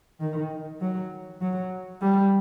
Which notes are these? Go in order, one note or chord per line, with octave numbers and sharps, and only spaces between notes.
D#3
F#3
F#3
G3